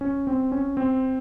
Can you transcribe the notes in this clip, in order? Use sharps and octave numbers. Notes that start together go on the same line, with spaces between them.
C#4
C4
C#4
C4